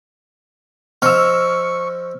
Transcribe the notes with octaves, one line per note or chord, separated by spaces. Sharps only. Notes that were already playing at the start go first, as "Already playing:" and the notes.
F3 D#5 C#6 E6 F6